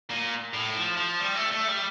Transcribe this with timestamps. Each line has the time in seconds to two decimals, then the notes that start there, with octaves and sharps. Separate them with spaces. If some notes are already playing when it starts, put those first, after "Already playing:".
0.11 A#2
0.54 A2
0.76 F3
0.97 F3
1.20 G3
1.35 A3
1.52 A3
1.68 G3